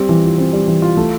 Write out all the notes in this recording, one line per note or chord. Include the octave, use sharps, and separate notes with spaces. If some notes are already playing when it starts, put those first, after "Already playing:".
Already playing: G3 C4
E3
F4
C4
G3
E3
F4
A3